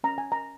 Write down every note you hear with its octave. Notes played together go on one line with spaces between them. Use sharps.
C#4 A#5
G#5
A#5